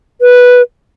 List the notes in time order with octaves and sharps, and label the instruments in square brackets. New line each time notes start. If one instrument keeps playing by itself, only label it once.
[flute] B4